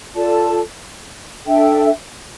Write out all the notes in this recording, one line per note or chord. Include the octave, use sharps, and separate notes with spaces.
F4 A4 D5 A5
D4 A4 E5 G5